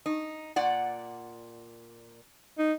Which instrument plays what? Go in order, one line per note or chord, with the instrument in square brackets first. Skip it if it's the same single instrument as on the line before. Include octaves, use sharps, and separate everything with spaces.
[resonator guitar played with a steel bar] D#4
A#2 D5 F#5
[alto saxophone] D#4